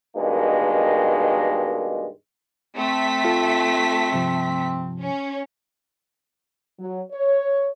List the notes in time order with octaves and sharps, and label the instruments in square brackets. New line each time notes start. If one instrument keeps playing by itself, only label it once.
[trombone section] G2 B2 D#3 G#3 A#3
[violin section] A3 B6 [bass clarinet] C4
[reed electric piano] F4 A4
G2 C3 F3
[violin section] C#4
[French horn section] F#3
C#5